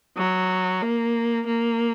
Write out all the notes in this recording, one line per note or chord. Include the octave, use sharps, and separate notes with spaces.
F#3
A#3
A#3